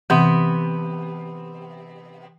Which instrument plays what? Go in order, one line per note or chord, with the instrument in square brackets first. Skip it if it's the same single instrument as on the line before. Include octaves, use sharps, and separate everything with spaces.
[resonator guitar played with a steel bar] C3 B3 [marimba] E3